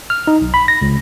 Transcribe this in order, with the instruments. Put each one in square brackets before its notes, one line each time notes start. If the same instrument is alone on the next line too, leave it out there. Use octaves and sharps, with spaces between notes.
[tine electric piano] F6
D#4
B1
B5
A#6
C#2